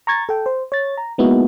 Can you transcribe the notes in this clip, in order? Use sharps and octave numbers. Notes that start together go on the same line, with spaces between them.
A#5 C#6 G#6 A6
A4 G5
C5
C#5 A6
A#5
G#3 A#3 B3 D#4 E4 F#4